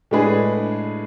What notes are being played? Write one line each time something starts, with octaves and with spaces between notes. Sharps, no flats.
A2 G#3 D4 G#4 B4